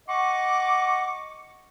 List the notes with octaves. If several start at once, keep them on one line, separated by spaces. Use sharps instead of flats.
D#5 F#5 C#6 D6